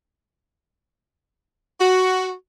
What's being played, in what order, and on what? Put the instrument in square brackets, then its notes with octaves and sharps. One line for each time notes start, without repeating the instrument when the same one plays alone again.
[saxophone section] F#4